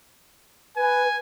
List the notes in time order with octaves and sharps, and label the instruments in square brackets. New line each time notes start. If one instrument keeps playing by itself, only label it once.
[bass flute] B4 [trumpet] G#5